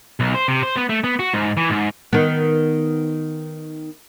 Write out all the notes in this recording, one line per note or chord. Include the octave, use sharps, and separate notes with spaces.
B1
C5
C3
C5
B3
A3
B3
F#4
G#2
E3
G#2
D#3 B3